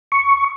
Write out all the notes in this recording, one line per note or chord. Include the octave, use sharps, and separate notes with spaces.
C#6